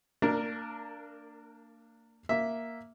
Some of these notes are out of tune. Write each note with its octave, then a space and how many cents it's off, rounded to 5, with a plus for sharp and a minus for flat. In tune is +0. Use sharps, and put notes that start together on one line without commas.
A#3 -35 D4 +0 A#4 +0
A#3 +0 E5 +0